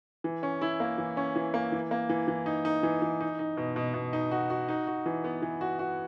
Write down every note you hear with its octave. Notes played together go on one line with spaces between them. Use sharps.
E3
C#4
E4
A#3
E3
C#4
E3
A#3
E3
A#3
E3
E3
D#4
D#4
E3
E3
D#4
D#4
B2
B2
B2
D#4
F#4
F#4
D#4
F#4
E3
B3
E3
F#4
F#4